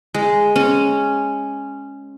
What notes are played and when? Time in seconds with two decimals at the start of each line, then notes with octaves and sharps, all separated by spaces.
0.14 G#3
0.56 C#4